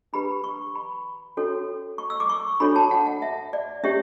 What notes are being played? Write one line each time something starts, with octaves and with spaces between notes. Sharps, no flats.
D4 G4 B4 B5
C#6
B5
C#4 F#4 A4 C#5
C#6
E6
D6
C#6
D4 F#4 A4 C#5 B5
A5
F#5
F#5
E5
D5
C#4 G4 C#5 E5